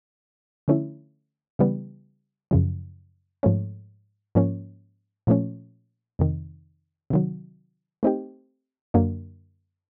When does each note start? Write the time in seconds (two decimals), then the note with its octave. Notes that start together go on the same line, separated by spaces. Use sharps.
0.68 D3 F3 A3 C#4 E4
1.59 C#3 E3 G3 B3
2.51 F#2 C#3 F3
3.43 G#2 F3 A3 C#4
4.35 G#2 F3 A#3 C#4
5.27 A#2 F3 A3 C#4
6.19 F2 C3 D#3
7.10 C3 D#3 F#3
8.03 A3 C4 D#4 G4
8.94 F#2 D3 F#3 A#3 D4